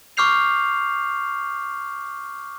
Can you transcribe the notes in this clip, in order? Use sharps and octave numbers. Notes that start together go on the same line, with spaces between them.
C#6 D6 F6 G6 C7 F7